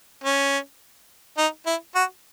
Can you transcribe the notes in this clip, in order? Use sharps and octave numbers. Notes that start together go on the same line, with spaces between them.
C#4
D#4
E4
F#4